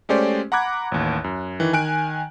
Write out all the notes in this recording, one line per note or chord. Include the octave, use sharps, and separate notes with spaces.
G#3 A3 C#4 G4 C5 D5
F#5 A#5 B5 D6 F#6 G#6
A1 D#2
F#2
D#3 E3
D#3 G#5 F#6 D7